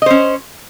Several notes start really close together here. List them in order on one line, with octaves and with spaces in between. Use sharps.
D#5 C5 C#4